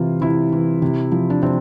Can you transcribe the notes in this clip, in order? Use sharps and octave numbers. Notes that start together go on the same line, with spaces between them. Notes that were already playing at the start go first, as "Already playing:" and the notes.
Already playing: C3 E3 F4
C3 E4
E3
C3
F3
D4
C3 C4